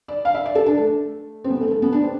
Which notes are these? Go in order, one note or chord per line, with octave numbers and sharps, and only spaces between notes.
D5
F5
E5
D5
A4
D4
A3
C4
B3
A3
A3
B3
D4
C4